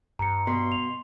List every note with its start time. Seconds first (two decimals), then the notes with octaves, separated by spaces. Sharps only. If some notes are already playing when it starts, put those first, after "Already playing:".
0.19 G2 A#5 C#7
0.47 B2 C6
0.72 F7